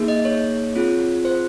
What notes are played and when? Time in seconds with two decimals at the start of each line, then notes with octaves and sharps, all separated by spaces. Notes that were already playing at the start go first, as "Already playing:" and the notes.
Already playing: A#3 D#4 G#4
0.08 D#5
0.25 C#5
0.75 C4 F4 G#4
1.25 C5